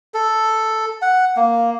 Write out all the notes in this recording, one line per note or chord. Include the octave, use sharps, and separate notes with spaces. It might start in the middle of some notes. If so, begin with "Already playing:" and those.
A4
F#5
A#3